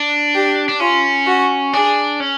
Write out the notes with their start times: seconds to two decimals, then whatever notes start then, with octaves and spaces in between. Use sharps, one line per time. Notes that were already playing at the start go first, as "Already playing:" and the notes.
Already playing: D4
0.33 G4
0.69 D4
0.80 C#4 F4
1.27 F#4
1.73 D4 G#4
2.20 C#4